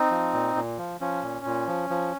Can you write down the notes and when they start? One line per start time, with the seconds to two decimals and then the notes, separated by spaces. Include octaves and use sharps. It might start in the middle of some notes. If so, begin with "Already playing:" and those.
Already playing: C4 D#4
0.11 F3
0.33 A#2
0.55 A#2
0.78 F3
1.01 F3 C#4
1.23 A#2
1.45 A#2
1.67 F3
1.90 F3